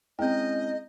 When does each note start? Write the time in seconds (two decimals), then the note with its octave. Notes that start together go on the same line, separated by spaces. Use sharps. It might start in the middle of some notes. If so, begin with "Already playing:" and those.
0.19 G#3 C4 C#4 E4 D#5 G5 G6